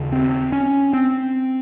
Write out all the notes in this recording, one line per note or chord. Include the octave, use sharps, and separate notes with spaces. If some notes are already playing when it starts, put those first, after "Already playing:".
Already playing: D#2 C#3
C4
C#4
C4